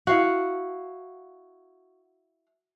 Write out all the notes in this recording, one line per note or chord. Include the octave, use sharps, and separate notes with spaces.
E4 F#4 F5 F#5